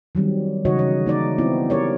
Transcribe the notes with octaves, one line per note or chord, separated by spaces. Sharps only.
D#3 F#3 G3 C4
C#3 E3 D#4 F#4 C#5 D#5
C#5
A#3 D#4 D5
B3 C4 E4
G4 A#4 C#5 D5